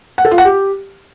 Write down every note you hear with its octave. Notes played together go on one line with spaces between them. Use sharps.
F#5
A4
F4
F#5
G4